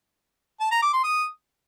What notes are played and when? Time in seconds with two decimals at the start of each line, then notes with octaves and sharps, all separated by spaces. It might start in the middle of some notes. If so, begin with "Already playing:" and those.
0.60 A5
0.71 A#5
0.82 D6
0.93 C6
1.04 D#6